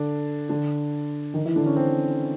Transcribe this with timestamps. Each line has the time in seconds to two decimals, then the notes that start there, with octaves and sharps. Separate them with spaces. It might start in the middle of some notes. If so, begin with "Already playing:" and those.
Already playing: D3 D4
0.49 D3 D4
1.34 D#3 D#4
1.45 E3 E4
1.56 D3 D4
1.66 C#4
1.76 C4